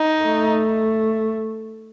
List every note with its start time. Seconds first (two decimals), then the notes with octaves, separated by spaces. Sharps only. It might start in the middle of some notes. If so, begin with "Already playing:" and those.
Already playing: D#4
0.23 A3